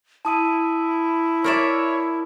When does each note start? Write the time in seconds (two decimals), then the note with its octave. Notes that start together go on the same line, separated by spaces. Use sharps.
0.25 E4 A5 D#6 D#7
1.44 A#4 C#5 D5 E5